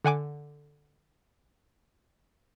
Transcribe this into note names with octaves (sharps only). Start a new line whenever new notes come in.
D3 F#5 G#5 D6